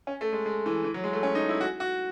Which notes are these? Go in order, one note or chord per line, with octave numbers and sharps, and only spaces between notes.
C#4
A3
G#3
G#3
E3
E3
F#3
G#3
A3
C#4
D#4
E4
F#4
F#4